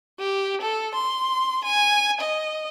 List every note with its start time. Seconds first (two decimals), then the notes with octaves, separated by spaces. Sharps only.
0.20 G4
0.61 A4
0.95 C6
1.65 G#5
2.21 D#5